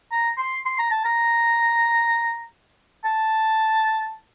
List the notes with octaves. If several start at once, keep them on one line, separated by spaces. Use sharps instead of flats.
A#5
C6
C6
A#5
A5
A#5
A5